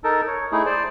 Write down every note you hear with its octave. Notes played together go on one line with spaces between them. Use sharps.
D#4 A4 A#4
C#5
A3 D#4 E4 G#4
C5 D5